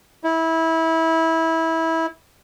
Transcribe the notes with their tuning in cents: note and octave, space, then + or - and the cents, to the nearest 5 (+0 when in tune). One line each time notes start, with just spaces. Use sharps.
E4 -20